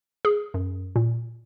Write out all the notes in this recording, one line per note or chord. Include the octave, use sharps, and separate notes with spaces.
G#4
F#2
A#2